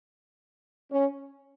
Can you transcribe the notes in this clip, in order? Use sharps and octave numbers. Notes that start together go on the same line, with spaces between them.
C#4